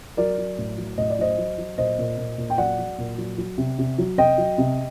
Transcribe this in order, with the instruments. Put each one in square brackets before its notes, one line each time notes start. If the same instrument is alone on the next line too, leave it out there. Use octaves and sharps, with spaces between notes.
[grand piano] F#3 A#4 D5
F#3
A2
F#3
A2 D#5
D5
F#3 C5 D#5
F#3
F#3
A#2 C5 D#5
A#2
A#2
A#2
G5
F#3 D5 F#5
F#3
A#2
F#3
F#3
C3
C3
F#3
C3 D#5 G5
F#3
C3